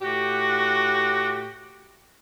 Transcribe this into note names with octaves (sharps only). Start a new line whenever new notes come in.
A2 F#4 G4